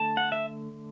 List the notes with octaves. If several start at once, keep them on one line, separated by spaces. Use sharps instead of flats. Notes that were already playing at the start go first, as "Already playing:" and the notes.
Already playing: D3 A3 A5
F#5
E5